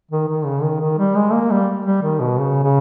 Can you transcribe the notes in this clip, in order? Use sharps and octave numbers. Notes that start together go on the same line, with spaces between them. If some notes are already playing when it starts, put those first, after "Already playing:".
D#3
D#3
C#3
D#3
D#3
G3
G#3
A#3
G3
G3
D#3
B2
C#3
C#3